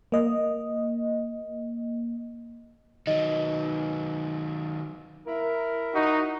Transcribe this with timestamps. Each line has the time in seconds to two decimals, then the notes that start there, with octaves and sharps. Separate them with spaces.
0.12 A#3 D#5
3.07 D#3 F#3 D#5
5.27 E4 A#4
5.94 D#4 F#4